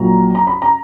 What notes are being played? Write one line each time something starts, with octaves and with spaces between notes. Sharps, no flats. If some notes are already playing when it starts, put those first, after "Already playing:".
Already playing: A#1 A#2 F#3 A#5
A#5
B5
A#5